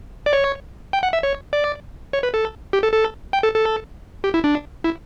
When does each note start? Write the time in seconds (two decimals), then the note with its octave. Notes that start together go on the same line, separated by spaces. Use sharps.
0.26 D5
0.33 C#5
0.93 G5
1.03 F#5
1.13 E5
1.23 C#5
1.53 D5
2.13 C#5
2.23 B4
2.34 A4
2.73 G4
2.83 A4
2.93 A4
3.33 G5
3.43 A4
3.54 A4
4.24 G4
4.34 E4
4.44 D4
4.84 E4